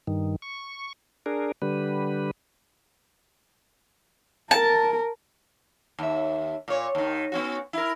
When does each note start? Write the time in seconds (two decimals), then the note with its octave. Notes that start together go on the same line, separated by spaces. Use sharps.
0.07 G2 D#3
0.42 C#6
1.26 D4 G#4 A#4
1.62 D3 G3 B4
4.51 A#4 A5
5.99 D#2 E5
6.68 A#2 C#5
6.95 D#2 D#3
7.32 B3 C#4 F#4
7.73 E4 A#4